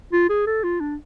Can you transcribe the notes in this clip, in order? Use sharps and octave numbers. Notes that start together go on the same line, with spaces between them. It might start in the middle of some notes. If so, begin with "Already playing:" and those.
F4
G#4
A4
F4
D4